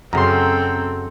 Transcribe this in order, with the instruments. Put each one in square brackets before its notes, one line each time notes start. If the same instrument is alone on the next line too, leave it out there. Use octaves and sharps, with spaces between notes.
[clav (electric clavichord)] F#2 C#3 [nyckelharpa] C4 A4 [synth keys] A#5 C6